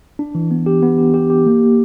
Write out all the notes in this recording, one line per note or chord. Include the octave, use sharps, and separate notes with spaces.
D4
E3
B3
G4
B3
G4
G4
G4
A#3